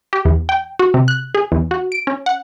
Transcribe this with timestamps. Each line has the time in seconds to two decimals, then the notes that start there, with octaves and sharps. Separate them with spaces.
0.13 G4
0.25 E2
0.49 G5
0.79 F#4
0.94 C3
1.08 F#6
1.35 G#4
1.52 E2
1.71 F#4
1.92 D7
2.07 C#4
2.26 F#5